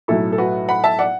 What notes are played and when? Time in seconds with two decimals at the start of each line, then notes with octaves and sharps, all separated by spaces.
0.08 B1 A2 F#3 A3 E4 A4
0.32 A4
0.38 F#4 B4
0.69 F#5 B5
0.84 E5 A5
0.99 D5 F#5